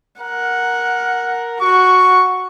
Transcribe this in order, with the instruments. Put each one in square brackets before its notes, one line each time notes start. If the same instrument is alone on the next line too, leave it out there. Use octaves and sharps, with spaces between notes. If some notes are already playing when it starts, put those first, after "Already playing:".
[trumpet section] A#4 [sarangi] F#5
[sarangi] F#4 [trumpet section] C#6